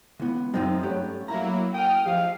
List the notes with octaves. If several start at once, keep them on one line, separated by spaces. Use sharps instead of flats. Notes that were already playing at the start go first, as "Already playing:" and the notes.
C#2 E3 B3
F#2 C4 D#4 F4
G2 A3 C#4 G4 F#5
F#3 A#3 E4 A#5
G5 D#6 F6
F3 G4 F5